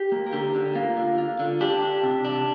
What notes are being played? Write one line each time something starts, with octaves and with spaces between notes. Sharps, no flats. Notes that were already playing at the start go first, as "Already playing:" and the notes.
Already playing: G4
A#3
A#4
D3 G4
D3
A#3 F4
D3
F4
D3
D4 G4
D4
C3
D4